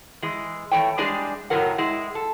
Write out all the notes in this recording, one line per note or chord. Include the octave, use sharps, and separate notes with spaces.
E3 G#3
E3 A3 C#5 G5
G3 G#3 D4 G4 G#4
F#2 A2 C#3 F#3 A#4 F#5
G#3 E4
A4